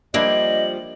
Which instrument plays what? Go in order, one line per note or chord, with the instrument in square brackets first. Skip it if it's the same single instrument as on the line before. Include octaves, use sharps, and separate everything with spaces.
[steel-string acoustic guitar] F3 G3 [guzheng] A#3 D4 E4 [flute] D#5 [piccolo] F#7